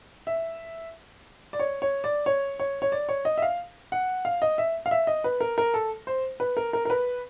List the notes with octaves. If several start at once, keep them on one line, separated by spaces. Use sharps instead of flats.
E5
D5
C#5
C#5
D5
C#5
C#5
C#5
D5
C#5
D#5
E5
F5
F#5
F5
D#5
E5
F5
E5
D#5
B4
A#4
A#4
A4
C5
B4
A#4
A#4
A#4
B4